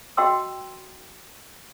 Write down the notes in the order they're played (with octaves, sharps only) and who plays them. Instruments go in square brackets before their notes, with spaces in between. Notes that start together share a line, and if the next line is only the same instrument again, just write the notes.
[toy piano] F#4 D#5 G5 C6 E6